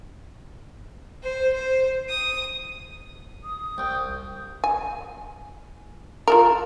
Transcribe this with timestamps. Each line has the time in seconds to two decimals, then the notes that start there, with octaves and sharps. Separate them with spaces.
1.23 C5
1.53 C5
2.10 D#6
3.44 D#6
3.78 C2 G5
4.64 G#5
6.28 F4 A4 A#4